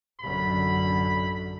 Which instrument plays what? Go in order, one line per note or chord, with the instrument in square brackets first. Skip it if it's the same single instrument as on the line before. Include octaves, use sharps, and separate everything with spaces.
[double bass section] A1 F#2 D3 [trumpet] B5